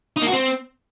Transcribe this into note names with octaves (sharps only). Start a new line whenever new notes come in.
D#4
A#3
F#4
C4